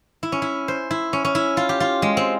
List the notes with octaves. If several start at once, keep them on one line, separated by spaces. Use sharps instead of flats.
E4
C#4
E4
C5
E4
C#4
C#4
E4
F4
G4
F4
G#3
C4